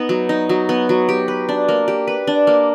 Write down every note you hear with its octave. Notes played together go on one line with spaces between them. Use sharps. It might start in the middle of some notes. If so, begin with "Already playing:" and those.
Already playing: B3 D#4
F#3
D#4
F#3
B3
F#3
G4
B4
D4
A#3
G4
B4
D4
A#3